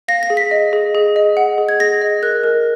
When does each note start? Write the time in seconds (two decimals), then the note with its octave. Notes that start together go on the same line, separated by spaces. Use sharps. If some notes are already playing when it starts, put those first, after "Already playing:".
0.08 F5 A#6
0.23 A#6
0.30 G#4
0.37 B6
0.51 D#5
0.73 G#4
0.95 G#4
1.16 D#5
1.37 F#5
1.58 G#4
1.69 G#6
1.80 G#4 A#6
2.01 D#5
2.22 A#4 F#6
2.44 A#4